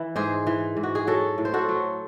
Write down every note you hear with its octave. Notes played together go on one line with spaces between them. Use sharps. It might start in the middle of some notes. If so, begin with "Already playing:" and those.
Already playing: E3 E4
G#2 G#4 C5
E3
G#2
F#4
G#4
F#3 F#4 A4
A2
C5
F#4 A4
F#3